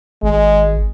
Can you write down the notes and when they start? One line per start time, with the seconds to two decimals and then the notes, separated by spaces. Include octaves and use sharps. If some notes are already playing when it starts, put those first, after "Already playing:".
0.23 G#1 G#3